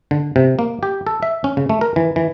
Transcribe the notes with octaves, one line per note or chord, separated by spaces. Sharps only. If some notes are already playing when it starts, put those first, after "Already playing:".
D3
C3
A#3
G4
A4
E5
C#4
C#3
A3
A#4
E3
E3